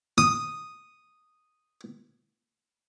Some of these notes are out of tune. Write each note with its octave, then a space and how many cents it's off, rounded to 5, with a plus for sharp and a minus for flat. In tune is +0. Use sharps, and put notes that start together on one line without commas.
D#6 -5